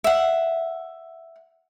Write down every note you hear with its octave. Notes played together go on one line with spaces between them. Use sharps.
E5 F#5